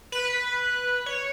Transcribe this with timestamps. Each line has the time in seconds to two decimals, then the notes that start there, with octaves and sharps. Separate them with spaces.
0.12 B4
1.06 C#5